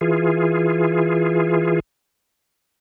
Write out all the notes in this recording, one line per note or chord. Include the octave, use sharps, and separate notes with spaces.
E3 F4 G#4